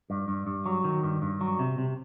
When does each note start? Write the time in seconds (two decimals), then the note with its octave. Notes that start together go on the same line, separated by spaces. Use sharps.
0.10 G2
0.28 G2
0.47 G2
0.66 F#3
0.84 D#3
1.03 G2
1.22 G2
1.41 F#3
1.59 C3
1.78 C3